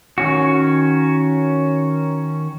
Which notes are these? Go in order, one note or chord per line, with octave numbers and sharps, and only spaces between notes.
D#3 C#4 F#4